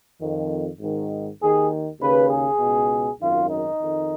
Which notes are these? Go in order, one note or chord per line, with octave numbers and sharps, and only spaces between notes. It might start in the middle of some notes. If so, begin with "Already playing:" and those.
F2 D#3
G#1 G#2 D#3
D#2 D#3 G#4
D#2 C#3 B4
G#4
C#2 B2
G#1 F#2 D#3 F4
D#4
F2 D#3